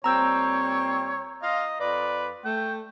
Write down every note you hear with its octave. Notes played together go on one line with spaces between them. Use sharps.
A#2 G3 C4 C#5 A#5 E6 G6
F4 D#5 F5
F2 F4 B4 D5
A3 G5